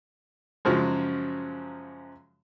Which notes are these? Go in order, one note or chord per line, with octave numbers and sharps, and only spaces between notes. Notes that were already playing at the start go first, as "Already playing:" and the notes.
F#2 C#3 F3 F#3 G#3